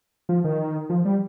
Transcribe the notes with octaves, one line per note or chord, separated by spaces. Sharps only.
F3
D#3
F3
G3